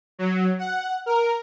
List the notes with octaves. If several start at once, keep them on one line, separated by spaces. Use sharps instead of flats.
F#3
F#5
A#4